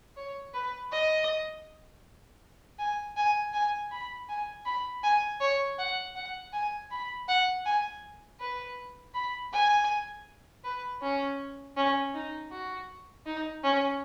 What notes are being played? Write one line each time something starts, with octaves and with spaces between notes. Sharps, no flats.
C#5
B4
D#5
G#5
G#5
G#5
B5
G#5
B5
G#5
C#5
F#5
F#5
G#5
B5
F#5
G#5
B4
B5
G#5
B4
C#4
C#4
D#4
F#4
D#4
C#4